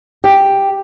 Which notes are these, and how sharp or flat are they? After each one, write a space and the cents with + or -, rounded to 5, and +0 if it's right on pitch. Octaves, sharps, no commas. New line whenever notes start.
G4 +5